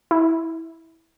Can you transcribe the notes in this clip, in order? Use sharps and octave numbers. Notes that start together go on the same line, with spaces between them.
E4